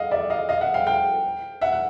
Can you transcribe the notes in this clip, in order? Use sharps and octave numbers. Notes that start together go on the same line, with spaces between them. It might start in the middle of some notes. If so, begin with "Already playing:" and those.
Already playing: D#5 F5 F#5
D5 E5
D#5 F5
D#5 F5
E5 F#5
F5 G5
F5 G5
E5 F#5
F#5